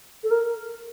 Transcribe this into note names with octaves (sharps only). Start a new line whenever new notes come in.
A4
A#4